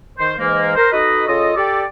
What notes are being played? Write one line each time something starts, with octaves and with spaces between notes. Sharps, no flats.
D#3 C5
G#2 E3 G#3 A#3
A#4 C5
D#4 F#4 A4 B4 D#5
C#3 F4 A4 D#5
G4 A4 D5